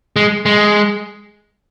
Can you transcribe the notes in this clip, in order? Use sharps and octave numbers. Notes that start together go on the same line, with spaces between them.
G#3
G#3